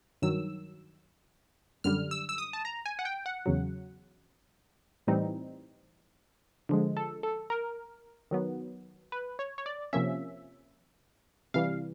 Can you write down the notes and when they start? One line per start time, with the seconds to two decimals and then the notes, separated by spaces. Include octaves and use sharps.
0.22 G2 D#3 F#3 E6
1.84 F#2 D3 G3 F6
2.11 E6
2.29 E6
2.38 D#6
2.53 A5
2.65 A#5
2.86 G#5
2.99 F#5
3.05 G5
3.26 F#5
3.46 E2 C#3 F#3
5.07 A2 E3 G3 C4 D#4
6.69 D3 F3 G#3
6.97 A4
7.23 A4
7.50 A#4
8.31 D#3 F#3 B3
9.12 B4
9.39 C#5
9.58 C#5
9.66 D5
9.93 C3 F3 A#3 C#4 E5
11.54 C3 E3 G3 F5